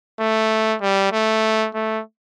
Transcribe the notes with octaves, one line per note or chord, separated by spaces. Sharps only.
A3
G3
A3
A3